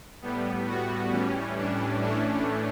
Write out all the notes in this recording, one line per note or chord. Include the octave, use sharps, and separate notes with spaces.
A2 G3 B3
F#4
A2 E3 G3 C#4
D4
A2 E3 A3 C#4 D4